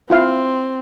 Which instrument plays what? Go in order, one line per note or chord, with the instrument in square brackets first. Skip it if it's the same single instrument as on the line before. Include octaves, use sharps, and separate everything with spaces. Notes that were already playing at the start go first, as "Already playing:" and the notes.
[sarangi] C4 [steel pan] E4 F4 F5